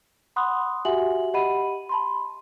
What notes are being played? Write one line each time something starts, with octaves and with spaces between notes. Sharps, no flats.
F#5 B5 C6 D#6 F#6
F#4 G4 E5 F#5 G#5 F#7
G4 D#5 F#5 B5 D#7
A5 B5 C6